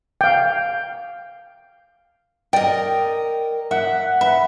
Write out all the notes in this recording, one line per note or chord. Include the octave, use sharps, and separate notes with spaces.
F5 G5
A#4 D5 D#5 G5
E5 F#5
B4 E5